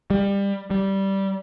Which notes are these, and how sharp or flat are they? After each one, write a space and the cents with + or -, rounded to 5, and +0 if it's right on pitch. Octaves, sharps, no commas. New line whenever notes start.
G3 +25
G3 -10